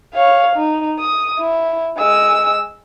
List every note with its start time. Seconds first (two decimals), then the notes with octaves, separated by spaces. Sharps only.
0.14 C#5 F5
0.56 D#4
0.99 D#6
1.39 E4
1.98 G#3 E6